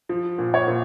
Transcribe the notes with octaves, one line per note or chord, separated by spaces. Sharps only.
F3
A#2
C#5
A#2